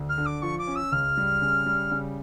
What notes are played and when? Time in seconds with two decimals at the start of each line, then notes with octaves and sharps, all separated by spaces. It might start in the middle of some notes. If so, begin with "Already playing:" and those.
Already playing: D2
0.09 F6
0.18 D3
0.26 D6
0.42 F3 C#6
0.58 D6
0.67 C#4
0.76 E6
0.92 C#2 F6
1.17 G3
1.42 C#3
1.66 G3
1.92 C#3